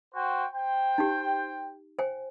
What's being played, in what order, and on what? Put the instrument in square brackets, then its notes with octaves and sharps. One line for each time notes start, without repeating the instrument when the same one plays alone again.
[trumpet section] F#4 C5 G5
C5 G5
[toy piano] D#4 G4
C5 G5 G#5